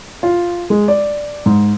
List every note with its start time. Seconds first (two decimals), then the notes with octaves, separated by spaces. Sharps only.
0.23 F4
0.70 G#3
0.88 D5
1.46 G#2